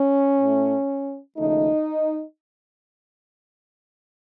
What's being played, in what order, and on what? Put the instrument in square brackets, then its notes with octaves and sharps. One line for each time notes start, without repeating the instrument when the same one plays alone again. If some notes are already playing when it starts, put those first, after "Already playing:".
Already playing: [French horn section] C#4
A2 A3
D#2 C#3 F3 A3 D#4